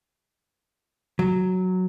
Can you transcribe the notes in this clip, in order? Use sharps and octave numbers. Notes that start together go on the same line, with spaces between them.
F#3